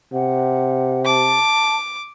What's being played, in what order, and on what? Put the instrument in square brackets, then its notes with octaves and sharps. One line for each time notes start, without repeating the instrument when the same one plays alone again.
[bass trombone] C3 [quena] F#5
[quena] A5 [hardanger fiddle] D6